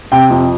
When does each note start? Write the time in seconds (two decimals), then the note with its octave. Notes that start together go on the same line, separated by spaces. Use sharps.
0.12 C3 G5
0.30 F2